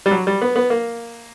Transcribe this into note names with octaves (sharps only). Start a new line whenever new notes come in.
G3
F#3
G3
B3
B3
A#3